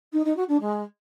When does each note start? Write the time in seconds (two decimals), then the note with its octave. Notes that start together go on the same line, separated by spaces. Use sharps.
0.12 D#4
0.24 D#4
0.36 F#4
0.48 D4
0.60 G#3